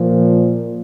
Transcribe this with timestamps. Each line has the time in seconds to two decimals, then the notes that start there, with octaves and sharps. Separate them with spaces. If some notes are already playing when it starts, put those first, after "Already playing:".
Already playing: A#2 F3